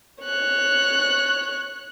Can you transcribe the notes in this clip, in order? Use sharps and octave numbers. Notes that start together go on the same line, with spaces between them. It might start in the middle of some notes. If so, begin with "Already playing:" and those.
C#5 F#6